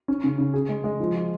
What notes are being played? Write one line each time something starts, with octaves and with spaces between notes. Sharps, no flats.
C#4
C#3
C#3
G#4
G#3
G#3
F3
F4